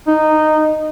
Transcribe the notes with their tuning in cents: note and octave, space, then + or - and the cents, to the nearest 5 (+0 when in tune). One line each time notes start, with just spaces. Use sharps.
D#4 -10